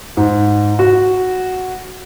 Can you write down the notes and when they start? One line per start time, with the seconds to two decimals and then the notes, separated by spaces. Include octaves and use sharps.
0.17 G#2
0.79 F#4